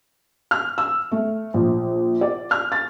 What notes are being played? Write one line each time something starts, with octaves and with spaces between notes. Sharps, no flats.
F6
E6
A3
A#1
D5
F6
A6